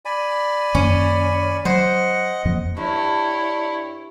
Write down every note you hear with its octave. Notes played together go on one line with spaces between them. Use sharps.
D5 G#5 B5
F#2 D#3 A#3 C#4
F#3 C5 D#5 F#5
F2 F3 A#3 D#5
G2 E4 C#5